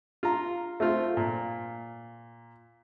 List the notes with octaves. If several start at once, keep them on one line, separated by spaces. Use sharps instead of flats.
F4 A#5
A3 C4 F4
A#2